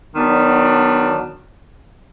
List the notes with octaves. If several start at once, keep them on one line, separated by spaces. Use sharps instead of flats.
D#3 F#3 B3 D4